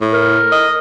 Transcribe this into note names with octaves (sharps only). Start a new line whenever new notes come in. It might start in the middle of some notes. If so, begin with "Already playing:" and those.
A2
A#4
D#5